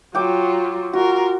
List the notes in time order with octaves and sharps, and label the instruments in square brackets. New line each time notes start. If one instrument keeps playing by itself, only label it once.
[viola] F#3 F4 [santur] G5 D6
[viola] F4 A#4 [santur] F#4